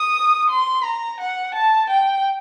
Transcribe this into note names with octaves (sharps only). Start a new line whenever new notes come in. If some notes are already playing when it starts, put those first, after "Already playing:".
Already playing: D#6
C6
A#5
F#5
A5
G5